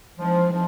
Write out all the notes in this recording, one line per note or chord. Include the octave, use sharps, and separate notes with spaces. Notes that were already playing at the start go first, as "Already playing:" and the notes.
E3 F3 G#3 C4 D#4 G#4
F3